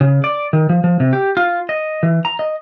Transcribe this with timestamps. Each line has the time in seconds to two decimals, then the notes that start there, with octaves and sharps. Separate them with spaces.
0.01 C#3
0.24 D5
0.53 D#3
0.69 F3
0.84 F3
1.00 C3
1.13 G4
1.37 F4
1.69 D#5
2.03 E3
2.25 A#5
2.39 D#5